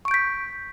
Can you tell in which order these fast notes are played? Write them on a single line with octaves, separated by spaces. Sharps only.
C#6 D7 G6 B6